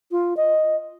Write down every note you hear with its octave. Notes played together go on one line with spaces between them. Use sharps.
F4
D#5